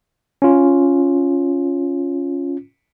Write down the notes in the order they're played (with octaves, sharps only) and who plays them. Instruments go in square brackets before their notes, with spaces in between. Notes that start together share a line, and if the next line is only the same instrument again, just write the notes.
[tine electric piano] C#4 F4